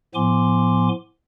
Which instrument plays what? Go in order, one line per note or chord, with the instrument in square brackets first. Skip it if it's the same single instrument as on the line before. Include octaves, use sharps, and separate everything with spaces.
[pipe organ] A2 F3 B3 G#5 C6 D6